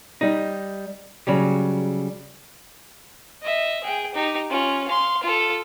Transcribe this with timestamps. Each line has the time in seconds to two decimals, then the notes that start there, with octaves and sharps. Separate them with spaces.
0.21 G3 D#4
1.27 C#3 F#3 G3
3.43 D#5 E5
3.84 G#4 G5
4.14 D#4 G4
4.50 C#4 F4
4.88 F5 C6
5.23 F4 A4